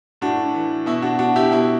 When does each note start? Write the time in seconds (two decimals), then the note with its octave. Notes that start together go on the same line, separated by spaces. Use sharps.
0.21 A2 D4 F#4
0.54 E3
0.86 B2 E4
1.02 D4 F#4
1.19 D4 F#4
1.36 E4 G4
1.52 B2 E4